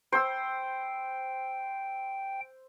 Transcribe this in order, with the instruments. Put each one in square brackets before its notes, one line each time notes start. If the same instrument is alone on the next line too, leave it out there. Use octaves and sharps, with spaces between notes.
[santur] C5 E6 [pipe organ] G5